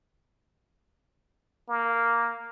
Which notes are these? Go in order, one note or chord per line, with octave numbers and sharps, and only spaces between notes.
A#3